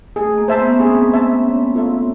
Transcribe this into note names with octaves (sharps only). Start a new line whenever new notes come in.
A3 G#4
A#3
C5 E5 A5
B3
C#4
C4 G#4
C5 E5 A5
C#4
F4 A4 C#5 E5